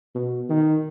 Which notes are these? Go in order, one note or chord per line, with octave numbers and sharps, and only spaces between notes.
B2
D#3